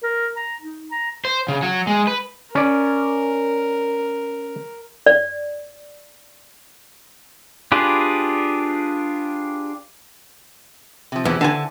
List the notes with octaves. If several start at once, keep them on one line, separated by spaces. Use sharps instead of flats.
A#4
A#5
D#4
A#5
C5
C#3
F#3
G#3
B4
C#4 A#4 D5
D5
D4 F4 G4 G#4 B4
C3 F3
E2 E3
D3 D4 F#5 G#5 A5